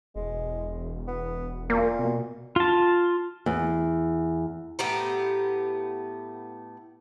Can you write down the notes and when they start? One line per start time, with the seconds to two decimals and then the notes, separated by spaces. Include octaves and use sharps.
0.16 E1 G#3
1.07 B3
1.70 A#2 A#3
1.99 B2
2.56 F4 A5
3.46 E2
4.79 A2 B3 G4 A#5